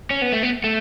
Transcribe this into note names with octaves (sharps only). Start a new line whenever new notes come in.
C#4
B3
A3
B3
A3